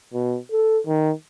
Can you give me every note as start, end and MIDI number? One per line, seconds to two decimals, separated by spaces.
0.14 0.38 47
0.52 0.79 69
0.87 1.12 51